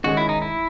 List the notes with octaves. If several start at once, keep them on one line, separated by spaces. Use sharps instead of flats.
D#3 G#3 C#4 F#4 G#4
E4
D#4
E4